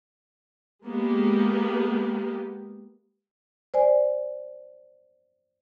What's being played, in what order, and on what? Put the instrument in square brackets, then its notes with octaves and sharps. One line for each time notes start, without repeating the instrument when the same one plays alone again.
[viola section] G#3 A#3 B3 G4
[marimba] C5 D5 G#5